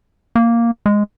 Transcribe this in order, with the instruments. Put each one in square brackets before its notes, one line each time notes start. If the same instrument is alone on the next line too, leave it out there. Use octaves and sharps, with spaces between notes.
[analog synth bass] A#3
G#3